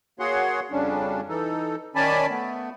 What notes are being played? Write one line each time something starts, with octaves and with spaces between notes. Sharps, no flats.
A#3 F#4 G#4 C#5 F#5 C6
F2 C#3 G3 C#4 D4
E3 D#4 A4
D#3 C#4 D5 G#5 A5 B5
A3 B3